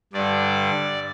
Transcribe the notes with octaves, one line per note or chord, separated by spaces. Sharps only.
G2 D3 D5